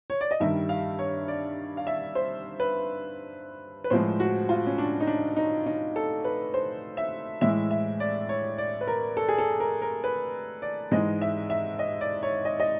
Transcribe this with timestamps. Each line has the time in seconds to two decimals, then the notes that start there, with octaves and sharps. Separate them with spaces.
0.10 C#5
0.21 D5
0.31 D#5
0.40 G2 D#3 G3 E5
0.69 F5
0.99 C#5
1.28 D5
1.77 F5
1.87 E5
2.15 C5
2.60 B4
3.84 B4
3.90 A2 F3 G#3 C5
4.20 F#4
4.49 F4
4.67 C#4
4.78 D4
5.00 D#4
5.07 D4
5.36 D#4
5.66 D#4
5.96 A4
6.24 B4
6.54 C5
6.97 E5
7.41 A2 E3 G#3 E5
7.71 E5
8.00 D5
8.29 C#5
8.58 D5
8.81 B4
8.87 A#4
9.17 A4
9.29 G#4
9.38 A4
9.60 A#4
9.82 A#4
10.04 B4
10.62 D5
10.91 G#2 E3 G#3 D#5
11.22 E5
11.50 E5
11.79 D#5
12.01 D5
12.23 C#5
12.45 D#5
12.60 D#5